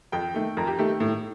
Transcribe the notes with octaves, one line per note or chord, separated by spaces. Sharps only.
F2 G5
D#3 A3
F2 A#4
G4
D#3 A3 G4
A2